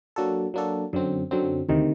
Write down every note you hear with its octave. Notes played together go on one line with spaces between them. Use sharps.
F#3 A#3 D4 F#4 A4
F#3 A#3 D4 F#4 A4
F#2 D3 F#3 C4
F#2 D3 F#3 C4
D2 C3 D#3